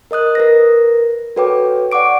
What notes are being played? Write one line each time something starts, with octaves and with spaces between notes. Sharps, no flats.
A#4 D#5 D#6 F#6
A#4 B4 A#6
F#4 A4 B4 C#5 G5 D6
D5 F#5 C#6 D6 D7